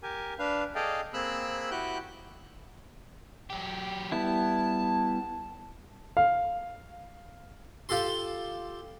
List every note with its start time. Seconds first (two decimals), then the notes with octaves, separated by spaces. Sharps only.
0.03 G4 A#4 G#5
0.39 D4 B4 F5
0.75 G#4 A4 D5 D#5 F5 G5
1.14 A#3 C4 G#4 B5 E6 F#6
1.71 E4 F#4 G4 G5 F#6 G6
3.50 F#3 G4
4.12 G3 B3 E4 A5
6.17 F5
7.89 F4 G4 A4 C6